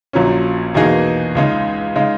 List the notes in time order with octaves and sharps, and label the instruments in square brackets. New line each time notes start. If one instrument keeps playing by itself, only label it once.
[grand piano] A#1 A#2 F#3 C#4
E2 B2 A#3 D#4 G#4
C#2 C#3 G#3 D#4
C#3 G#3 D#4